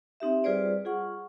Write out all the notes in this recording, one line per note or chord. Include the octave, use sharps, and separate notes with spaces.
C4 D#4 G4 E5
G3 F4 G#4 B4 C5 D5
F4 G#4 F#5 C#6